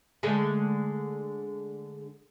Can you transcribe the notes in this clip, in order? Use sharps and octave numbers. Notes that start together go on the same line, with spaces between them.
D3 G#3 A3